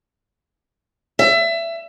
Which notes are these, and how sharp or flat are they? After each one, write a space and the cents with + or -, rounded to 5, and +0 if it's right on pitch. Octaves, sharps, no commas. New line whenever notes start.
E5 +25